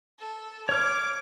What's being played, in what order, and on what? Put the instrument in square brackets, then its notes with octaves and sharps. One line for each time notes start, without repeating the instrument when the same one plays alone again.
[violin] A4
[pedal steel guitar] C#5 F6 [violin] D6